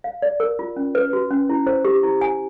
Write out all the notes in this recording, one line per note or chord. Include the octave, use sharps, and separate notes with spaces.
F5
D5
A#4
F4
C#4
B4
F#4
C#4
E4
C5
G4
E4
G#5